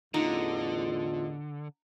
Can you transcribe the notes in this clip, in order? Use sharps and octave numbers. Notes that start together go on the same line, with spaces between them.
A1 E2 D3 D#4 F4